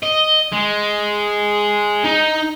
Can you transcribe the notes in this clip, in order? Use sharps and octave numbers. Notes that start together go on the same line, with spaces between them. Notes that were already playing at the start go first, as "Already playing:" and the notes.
D#5
G#3
D#4